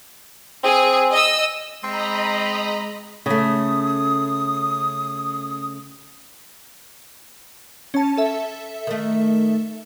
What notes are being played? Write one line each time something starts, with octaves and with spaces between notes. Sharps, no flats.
C4 G#4
D#5 E6
G#3 C4 D#5 A#5 B5
C#3 A3 D#6
C#4 A5
A4 E5
D#3 A3